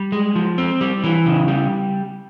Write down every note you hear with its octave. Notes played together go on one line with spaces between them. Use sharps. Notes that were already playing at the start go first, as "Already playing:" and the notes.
Already playing: G3
G#3
F3
C4
G3
E3
C#3
G3